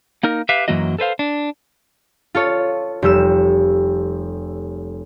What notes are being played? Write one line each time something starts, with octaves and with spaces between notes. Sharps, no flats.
A#3 D#4 A#4
G4 B4 E5 F5
F#2 E3 F#3 A#3 F#4 D#5
A4 B4 C5 F5
D4
F4 A4 C#5
F1 G3 E6 E7